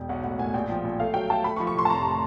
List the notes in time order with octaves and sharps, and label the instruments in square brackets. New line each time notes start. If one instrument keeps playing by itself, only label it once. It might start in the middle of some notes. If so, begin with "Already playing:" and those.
Already playing: [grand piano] E1 [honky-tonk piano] G5
[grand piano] B1 [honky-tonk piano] F#5
[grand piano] A2 [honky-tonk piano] F#5
[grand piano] A2 [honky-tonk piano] G#5
[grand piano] A#1 [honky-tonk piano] G5
[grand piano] F3
A#1
[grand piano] A3 [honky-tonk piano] F5
[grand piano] F#3 [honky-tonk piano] G5
[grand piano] A3 [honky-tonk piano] A5
[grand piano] A3 [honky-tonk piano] B5
[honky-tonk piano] C#6
[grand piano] F3
[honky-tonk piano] C#6
[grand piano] A2 [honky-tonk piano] C6
[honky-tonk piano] A5
[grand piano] F1 [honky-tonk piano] A#5